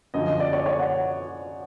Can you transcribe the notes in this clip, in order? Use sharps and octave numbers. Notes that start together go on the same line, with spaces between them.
F#2 D3 F3 D#5
D#5
D5
C#5
C#5
F#5